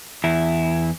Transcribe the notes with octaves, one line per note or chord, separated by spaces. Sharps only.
E2 E4